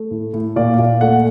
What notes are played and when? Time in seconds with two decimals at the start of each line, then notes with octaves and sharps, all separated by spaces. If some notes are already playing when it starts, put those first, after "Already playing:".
Already playing: A3
0.11 A2
0.34 A2
0.56 A#2 D5
0.79 A#2
1.01 A3 F#5